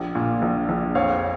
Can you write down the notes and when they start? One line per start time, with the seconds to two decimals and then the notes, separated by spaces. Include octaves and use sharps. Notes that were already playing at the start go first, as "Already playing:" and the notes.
Already playing: A#1
0.15 A#2
0.42 A#1
0.69 A#1
0.95 F2 C#5 F5